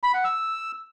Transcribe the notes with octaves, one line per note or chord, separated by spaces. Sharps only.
B5
F#5
E6